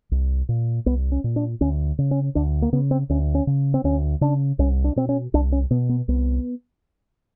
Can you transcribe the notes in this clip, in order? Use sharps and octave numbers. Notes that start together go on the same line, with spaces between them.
C2
A#2
C2 B3
C#4
A#2
D4
D2 C#4
C#3
C#4
D2 D4
A#3
C#3 B3
C4
D2 C#4
C#4
C#3
C4
D2 C#4
C#3 D4
C2 C#4
D4
B2 C4
C#4
C2 D4
C#4
B2 B3
B3
C2 B3